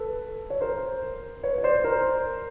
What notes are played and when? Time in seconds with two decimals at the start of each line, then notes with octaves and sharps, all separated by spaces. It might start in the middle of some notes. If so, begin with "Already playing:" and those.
Already playing: A4 B4
0.50 C#5
0.61 A#4 C5
1.43 B4 C#5
1.58 C#5
1.63 C5 D5
1.84 A#4 C5